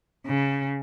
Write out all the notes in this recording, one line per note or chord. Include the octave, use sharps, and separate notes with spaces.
C#3